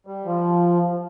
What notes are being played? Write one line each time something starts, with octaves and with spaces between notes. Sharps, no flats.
G3
F3